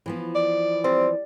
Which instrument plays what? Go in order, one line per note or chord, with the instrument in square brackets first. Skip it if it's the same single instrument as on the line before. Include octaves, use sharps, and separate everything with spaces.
[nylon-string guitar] E3 F3 B3
[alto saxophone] D5
[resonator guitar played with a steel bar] G3 [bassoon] C4